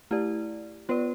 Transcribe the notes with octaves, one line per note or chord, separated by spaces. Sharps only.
A3 E4 G4 D5
B3 F4 B4 D5